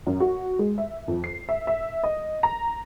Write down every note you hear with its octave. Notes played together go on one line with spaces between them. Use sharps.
F#2
F#4
G#3
E5
F2
C7
E5
E5
D#5
A#5